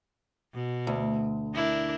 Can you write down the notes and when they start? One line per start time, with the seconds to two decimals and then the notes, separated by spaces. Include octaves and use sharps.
0.54 B2
0.87 D2
1.54 D4 E4 A#4